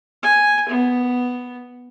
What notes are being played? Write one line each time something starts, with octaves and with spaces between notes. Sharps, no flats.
G#5
B3